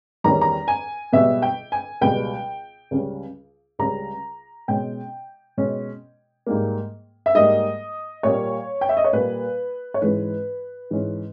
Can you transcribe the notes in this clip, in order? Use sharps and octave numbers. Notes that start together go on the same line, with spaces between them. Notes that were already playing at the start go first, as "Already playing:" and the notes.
E2 D#3 G3 C#4 A#5
A#5
G#5
C#2 B2 G3 B3 E5
G5
G#5
C#2 B2 G3 B3 G5
C#2 C#3 G3 C#4
C#2 C#3 G3 C#4 A#5
B2 G#3 C#4 G5
B2 G#3 C#4
G#2 G3 A#3
E5
G#2 G3 A#3 D#5
A#2 G3 A#3 C#5
G5
E5
D#5
C#5
A#2 G3 A#3 B4
C#5
G#2 E3 G#3 C#4 B4
G#2 E3 G#3 C#4